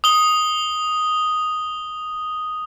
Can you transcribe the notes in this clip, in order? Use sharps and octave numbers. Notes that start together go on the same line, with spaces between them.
D#6 G7